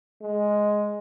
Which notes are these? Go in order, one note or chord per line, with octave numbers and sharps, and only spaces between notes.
G#3